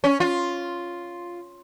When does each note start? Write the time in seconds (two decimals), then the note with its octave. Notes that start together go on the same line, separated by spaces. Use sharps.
0.04 C#4
0.20 F4